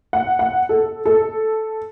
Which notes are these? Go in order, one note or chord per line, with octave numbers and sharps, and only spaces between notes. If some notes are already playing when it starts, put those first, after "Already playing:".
F#5
F#5
A4
A4